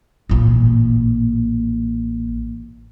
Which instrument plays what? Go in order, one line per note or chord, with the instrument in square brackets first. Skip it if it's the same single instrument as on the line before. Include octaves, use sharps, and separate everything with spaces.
[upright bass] A1 A#2